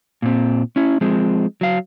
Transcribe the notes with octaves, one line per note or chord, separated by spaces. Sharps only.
A#2 C4
C#4 E4
F3 G#3 C4
F#3 F5